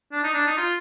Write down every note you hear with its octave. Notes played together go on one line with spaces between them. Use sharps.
D4
D#4
D4
D#4
F4